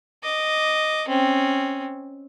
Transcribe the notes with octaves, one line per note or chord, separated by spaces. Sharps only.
D#5 D6
C4 C#4